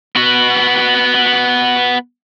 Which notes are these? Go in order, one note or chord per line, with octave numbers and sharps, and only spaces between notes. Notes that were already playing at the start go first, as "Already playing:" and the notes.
B3 F#4